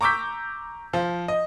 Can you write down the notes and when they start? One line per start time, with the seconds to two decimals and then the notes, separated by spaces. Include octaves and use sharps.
0.01 A#5 C#6 D6 E6 G6 B6
0.93 F3
1.28 D#5